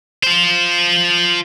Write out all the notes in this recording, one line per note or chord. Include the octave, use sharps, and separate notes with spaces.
F4 C5